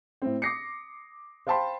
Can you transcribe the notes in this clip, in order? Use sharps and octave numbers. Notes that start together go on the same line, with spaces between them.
A2 C4
D6 D#6 A#6 C7 C#7
C5 F5 G5 A5 B5 C6